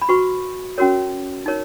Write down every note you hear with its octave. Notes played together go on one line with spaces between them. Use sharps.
B5
F#4 B4 C#6
C#4 F#4 A#4 C#5
D#4 A#4 C#5